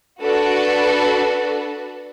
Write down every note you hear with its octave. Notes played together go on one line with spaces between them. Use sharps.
D4 F#4 A4 B4